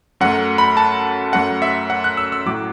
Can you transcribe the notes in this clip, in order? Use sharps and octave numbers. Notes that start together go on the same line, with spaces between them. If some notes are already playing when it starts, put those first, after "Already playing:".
F#2 F#3 A3 F#5
B5
A5
F#2 F#3 A3 F#5
E5
F#5
F#6
E6
E6
A2 F#3 A3 D6